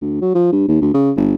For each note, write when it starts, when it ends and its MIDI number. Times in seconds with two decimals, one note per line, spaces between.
0.01 0.18 38
0.21 0.31 54
0.34 0.51 53
0.52 0.67 43
0.68 0.78 39
0.81 0.89 38
0.94 1.11 49
1.16 1.35 31